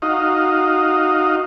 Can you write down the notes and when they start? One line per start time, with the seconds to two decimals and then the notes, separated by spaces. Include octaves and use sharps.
0.02 D#4 F#4 D#5 F5